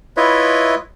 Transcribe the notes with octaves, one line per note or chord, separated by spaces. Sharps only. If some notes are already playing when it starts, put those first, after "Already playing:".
E4 F4 B4 C#5 D#5 E5